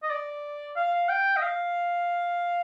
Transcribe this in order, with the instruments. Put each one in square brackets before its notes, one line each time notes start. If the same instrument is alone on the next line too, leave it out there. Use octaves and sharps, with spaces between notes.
[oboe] D#5
D5
F5
G5
D#5
F5